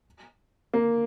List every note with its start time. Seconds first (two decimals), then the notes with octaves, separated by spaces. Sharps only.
0.74 A#3